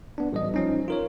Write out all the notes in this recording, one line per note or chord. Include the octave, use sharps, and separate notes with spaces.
B3 D4
A1 G3 D#5
F3 C#4 D#4
F4 A#4 C#5